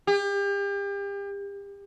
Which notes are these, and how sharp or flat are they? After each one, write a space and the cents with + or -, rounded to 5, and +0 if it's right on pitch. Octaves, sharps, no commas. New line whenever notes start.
G4 +35